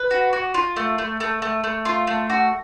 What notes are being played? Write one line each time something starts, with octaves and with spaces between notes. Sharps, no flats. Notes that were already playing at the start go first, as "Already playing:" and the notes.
Already playing: B4
F#4
F#4
F4
A3
A3
A3
A3
A3
F4
A3
F#4